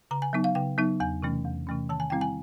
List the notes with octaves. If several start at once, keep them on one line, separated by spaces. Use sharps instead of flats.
C#3 A#5
G#5
F#3 B3 D#4
F5
C#3 G5
F#3 B3 D#4
E2 G#5
C3 E3 A3 C#4
E2
C3 E3 A3 C#4
D#3 A5
G#5
G3 C4 E4 G5
G#5